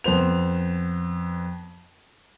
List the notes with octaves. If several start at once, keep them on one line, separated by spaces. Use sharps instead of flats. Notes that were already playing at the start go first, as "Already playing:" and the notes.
F2 B3 C5 F7